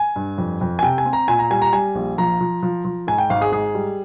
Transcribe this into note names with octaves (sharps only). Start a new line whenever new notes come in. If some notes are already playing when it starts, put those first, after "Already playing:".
Already playing: G#5
G2
F2
F2
G#5
C3 G5
G#5
C4
A#5
A#2 G#5
A#5
G3 G#5
A#5
G3 G#5
A#1
F3 A#5
F3
F3
F3
G#2 G#5
G5
G#1 F5
G#4
G#2 G#4
G3